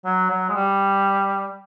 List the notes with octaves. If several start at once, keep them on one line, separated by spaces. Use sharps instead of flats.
F#3
F#3
G#3
G3